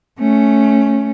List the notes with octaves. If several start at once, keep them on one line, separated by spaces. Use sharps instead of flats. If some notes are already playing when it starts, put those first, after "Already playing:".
A3 C#4